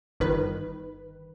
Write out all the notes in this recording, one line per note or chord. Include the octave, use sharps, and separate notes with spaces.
G1 D#3 B4